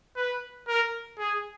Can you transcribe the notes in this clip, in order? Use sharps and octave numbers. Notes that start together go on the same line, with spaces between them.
B4
A#4
G#4